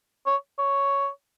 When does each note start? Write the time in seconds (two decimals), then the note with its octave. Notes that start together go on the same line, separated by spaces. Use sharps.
0.26 C#5
0.59 C#5